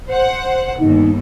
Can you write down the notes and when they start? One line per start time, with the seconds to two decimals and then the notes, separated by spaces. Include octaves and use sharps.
0.10 C5 F#5
0.80 G1 D#2 D#4